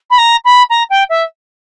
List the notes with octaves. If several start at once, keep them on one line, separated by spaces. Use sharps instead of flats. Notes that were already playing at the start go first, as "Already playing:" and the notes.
B5
A#5
B5
A#5
G5
E5